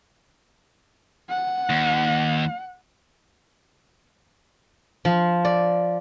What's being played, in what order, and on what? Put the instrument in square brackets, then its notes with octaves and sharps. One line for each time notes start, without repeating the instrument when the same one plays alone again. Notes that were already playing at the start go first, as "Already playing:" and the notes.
[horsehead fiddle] F#5
[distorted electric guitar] D#2
[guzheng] F3
D5